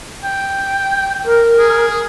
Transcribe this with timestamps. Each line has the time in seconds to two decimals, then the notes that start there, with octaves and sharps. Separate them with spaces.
0.24 G5
1.24 A#4
1.59 G#4